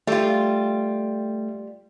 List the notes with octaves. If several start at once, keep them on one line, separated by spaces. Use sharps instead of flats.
G3 A3 F4